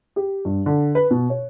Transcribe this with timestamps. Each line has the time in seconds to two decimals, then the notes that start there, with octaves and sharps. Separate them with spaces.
0.16 G4
0.45 G2
0.66 D3
0.95 B4
1.11 B2
1.30 C#5